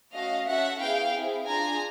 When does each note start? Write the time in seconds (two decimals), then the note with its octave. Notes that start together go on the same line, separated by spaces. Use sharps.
0.14 A3 C#4 F#4 D#5 F5
0.47 C#4 F#4 A4 E5 F#5
0.80 B3 E4 G#4 F5 G5
1.14 C4 E4 G#4
1.47 D4 F4 G#4 G#5 A#5